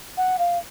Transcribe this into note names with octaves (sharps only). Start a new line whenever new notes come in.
F#5
F5